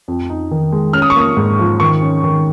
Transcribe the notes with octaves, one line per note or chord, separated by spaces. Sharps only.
F2
D#4
D#3
G#3
C#4 F6
D#6
C#6
A#3 D#6
G#2
F3
D#3 C#6
C#4
D#3